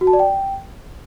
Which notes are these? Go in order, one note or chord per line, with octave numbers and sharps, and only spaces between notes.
F#4
A5
D5
G5